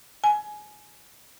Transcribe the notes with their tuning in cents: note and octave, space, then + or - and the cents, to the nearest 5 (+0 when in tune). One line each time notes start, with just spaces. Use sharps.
G#5 +20